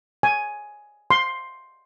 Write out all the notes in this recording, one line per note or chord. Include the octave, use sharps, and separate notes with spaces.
G#5
C6